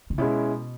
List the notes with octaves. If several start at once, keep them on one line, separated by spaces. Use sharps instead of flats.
C#3
B2 G#3 C#4 E4